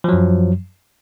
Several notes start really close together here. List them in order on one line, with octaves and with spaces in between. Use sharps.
F3 F#3 F#2